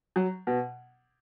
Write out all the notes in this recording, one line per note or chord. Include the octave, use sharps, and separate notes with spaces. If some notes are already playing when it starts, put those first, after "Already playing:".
F#3
B2